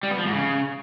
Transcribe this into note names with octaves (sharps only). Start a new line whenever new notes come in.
G3
B3
F3
G#2
C#3